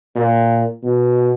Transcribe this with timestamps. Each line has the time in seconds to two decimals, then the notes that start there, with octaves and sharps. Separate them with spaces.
0.16 A#2
0.83 B2